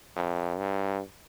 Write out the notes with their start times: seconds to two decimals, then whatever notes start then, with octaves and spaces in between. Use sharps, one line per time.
0.16 F2
0.58 G2